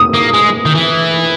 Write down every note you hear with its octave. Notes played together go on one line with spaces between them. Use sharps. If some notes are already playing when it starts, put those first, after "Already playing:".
Already playing: D#6
A#3
G#3
D#3
E3